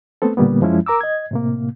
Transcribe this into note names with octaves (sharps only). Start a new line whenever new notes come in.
A3 B3 C4 A4
A#2 D3 G3 A#3 B3
F#2 F3 G#3 C#4 E4
A#4 A#5 D6 E6
D#5 G#6
A2 C3 A#3